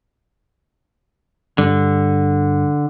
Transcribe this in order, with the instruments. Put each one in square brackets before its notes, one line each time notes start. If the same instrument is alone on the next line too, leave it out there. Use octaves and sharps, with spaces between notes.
[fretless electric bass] G2 G3 [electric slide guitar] D3